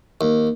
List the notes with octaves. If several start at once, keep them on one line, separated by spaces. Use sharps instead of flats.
D#2